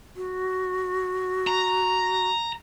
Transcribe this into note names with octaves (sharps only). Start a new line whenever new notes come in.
F#4
A#5